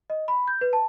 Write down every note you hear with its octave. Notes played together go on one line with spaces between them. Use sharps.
D#5
B5
G6
B4
A5